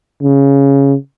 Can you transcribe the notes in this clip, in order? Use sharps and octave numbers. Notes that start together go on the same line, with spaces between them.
C#3